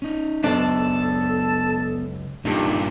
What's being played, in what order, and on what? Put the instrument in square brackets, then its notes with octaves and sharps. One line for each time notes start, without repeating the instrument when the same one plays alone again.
[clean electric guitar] C#4 D#4
[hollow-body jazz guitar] C#2 F#2 D4 [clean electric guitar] B3 C5 D5 [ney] A4 [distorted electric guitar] A5
[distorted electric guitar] G2 A#2 [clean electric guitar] D4 D#4 A4 [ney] G4